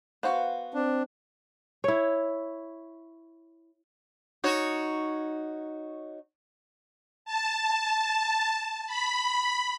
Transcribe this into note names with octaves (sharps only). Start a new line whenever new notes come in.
B3 F#4 C5 F5
C4 D4
E4 C#5
D#4 F#4 C#5
A5
B5